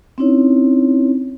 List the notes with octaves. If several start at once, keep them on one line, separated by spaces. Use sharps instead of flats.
C4 C#4 D#4 E4 C#5